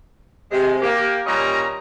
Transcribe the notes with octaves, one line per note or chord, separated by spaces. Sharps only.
C3 G#3
A#3 G4
A#2 G3 C#4 D#5 A#5